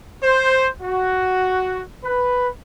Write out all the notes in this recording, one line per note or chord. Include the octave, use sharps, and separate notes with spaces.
C5
F#4
B4